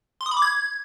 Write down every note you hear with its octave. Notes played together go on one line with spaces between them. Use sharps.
C6
D#6
B5
D6
G#6